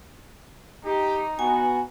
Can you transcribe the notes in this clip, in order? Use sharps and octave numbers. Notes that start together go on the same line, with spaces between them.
D#4 G4
B3 F#4 G#5